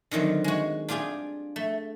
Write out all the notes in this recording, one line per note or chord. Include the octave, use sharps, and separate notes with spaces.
D3 D#3 F#3 C4
G#3 F#4
D4 F4 G4 G#4 G5
A3